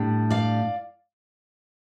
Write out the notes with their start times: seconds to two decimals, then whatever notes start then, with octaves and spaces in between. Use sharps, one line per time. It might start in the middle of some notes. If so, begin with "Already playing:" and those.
Already playing: A2 G3 D4
0.30 D5 F5